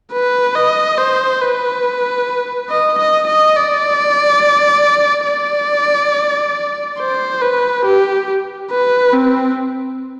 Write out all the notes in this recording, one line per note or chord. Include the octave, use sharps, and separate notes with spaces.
B4
D#5
C5
B4
D#5
D#5
D#5
D5
D5
C5
B4
G4
B4
C4